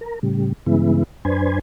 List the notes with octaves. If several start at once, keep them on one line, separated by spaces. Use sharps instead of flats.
A#4
A2 C#3 G3
G2 C#3 E3 G#3 B3 E4
F#2 D4 B4 C5 G#5